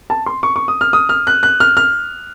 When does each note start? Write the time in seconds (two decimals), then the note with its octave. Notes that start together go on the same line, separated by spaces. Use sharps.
0.10 A5
0.26 C6
0.43 C#6
0.56 C#6
0.68 D#6
0.81 F6
0.93 D#6
1.09 F6
1.27 F#6
1.43 F#6
1.60 F6
1.77 F6